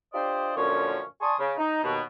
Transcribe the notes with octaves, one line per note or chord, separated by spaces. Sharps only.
D4 F4 G4 C5 D5 D#5
F#2 A#2 D3 F3 C#4 C#5
D5 G#5 A5 C6 C#6 D#6
C#3
D#4
D#2 B2